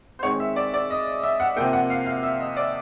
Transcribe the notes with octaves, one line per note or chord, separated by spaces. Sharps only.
C5
D#3 G#3 C4 C#5
E5
D5
D5
D#5
E5
F#5
C3 F3 A#3 G5
F#5
F5
F5
E5
D#5
D5